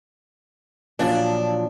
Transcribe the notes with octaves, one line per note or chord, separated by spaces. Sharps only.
A#2 F3 F#3 D4